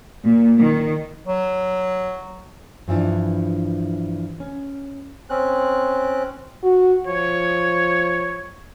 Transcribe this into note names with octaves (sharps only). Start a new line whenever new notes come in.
A#2
D#3
F#3
G2 E3 F3 D4
C#4
C4 C#4 F#6
F#4
F3 C#5